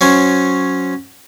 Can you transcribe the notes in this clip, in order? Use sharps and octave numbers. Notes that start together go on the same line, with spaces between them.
F#3 C#4 C5